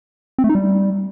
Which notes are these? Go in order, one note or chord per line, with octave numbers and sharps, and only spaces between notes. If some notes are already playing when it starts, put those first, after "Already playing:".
C4
A3
D#4
G3